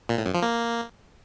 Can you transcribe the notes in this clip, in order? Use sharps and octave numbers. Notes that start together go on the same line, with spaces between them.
A#2
A2
F#2
F3
A#3